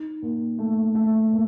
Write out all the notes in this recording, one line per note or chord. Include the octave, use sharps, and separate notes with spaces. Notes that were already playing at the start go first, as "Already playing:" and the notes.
Already playing: D#4
A#2
A3
A3
A#2